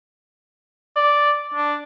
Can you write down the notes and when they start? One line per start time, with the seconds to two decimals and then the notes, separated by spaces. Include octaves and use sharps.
0.96 D5
1.54 D4